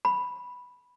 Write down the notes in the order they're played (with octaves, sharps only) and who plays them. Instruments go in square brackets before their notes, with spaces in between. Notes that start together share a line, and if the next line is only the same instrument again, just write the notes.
[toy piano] B5